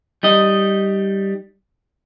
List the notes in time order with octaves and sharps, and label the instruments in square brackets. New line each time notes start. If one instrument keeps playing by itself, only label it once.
[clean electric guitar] G3 D#4 D#5